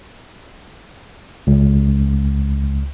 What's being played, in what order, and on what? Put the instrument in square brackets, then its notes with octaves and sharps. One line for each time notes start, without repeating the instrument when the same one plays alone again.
[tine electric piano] C#2